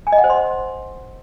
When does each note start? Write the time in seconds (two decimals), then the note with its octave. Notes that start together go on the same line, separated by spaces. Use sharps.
0.07 G#5
0.12 D#5
0.18 F#5
0.24 C5
0.30 C6